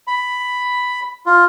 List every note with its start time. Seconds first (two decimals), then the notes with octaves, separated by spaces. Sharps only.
0.07 B5
1.26 F4